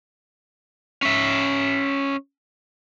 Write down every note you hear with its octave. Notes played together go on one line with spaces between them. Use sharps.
C#4 E5